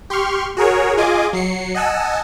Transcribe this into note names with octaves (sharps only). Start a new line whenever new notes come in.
G4 C6 C#6 F6
F#4 G#4 A#4 C#5
F4 G#4 D#5 G#5 D6
F#3 C7 C#7
D#5 F#5 G#5 A5 E6